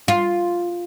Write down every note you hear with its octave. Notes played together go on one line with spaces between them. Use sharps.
F4